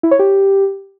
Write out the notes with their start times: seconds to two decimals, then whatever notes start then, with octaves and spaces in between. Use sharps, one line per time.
0.03 E4
0.11 C#5
0.19 G4